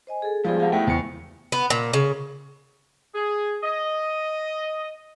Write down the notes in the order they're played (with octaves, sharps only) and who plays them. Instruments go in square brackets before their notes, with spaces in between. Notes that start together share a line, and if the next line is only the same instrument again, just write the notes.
[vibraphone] C5 D#5 G#5
G#4 A4
[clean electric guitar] G#2 G3 [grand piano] F3 [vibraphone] G#3 B3 G#4
[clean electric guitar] G#3 F5 [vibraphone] G4 F#5 A5
[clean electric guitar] C#2 E4 G5 [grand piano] A3 [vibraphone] B3
[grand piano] E2 C#7 [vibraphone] C5 C#6
[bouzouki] B3
A#2
C#3
[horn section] G#4
D#5